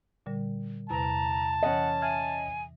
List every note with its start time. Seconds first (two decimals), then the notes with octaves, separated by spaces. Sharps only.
0.26 A#2 D3 G3
0.90 E2 C3 B4 A5 A#5
1.63 E3 C#4 D#5 F#5
2.02 E5 G#5 F6 G#6